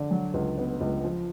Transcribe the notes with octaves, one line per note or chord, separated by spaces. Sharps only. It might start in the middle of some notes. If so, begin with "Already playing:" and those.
Already playing: D3 D5
F#3
C#2
B3
C#2
F3